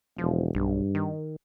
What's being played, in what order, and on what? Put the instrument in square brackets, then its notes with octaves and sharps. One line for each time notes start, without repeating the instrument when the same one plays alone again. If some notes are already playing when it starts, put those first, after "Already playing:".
[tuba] E1 [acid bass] F3
[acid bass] B1 [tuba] G2
[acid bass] D#3